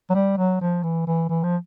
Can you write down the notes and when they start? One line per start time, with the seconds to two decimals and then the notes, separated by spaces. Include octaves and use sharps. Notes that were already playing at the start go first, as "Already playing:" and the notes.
0.10 F#3
0.14 G3
0.37 F#3
0.61 F3
0.83 E3
1.07 E3
1.29 E3
1.43 F3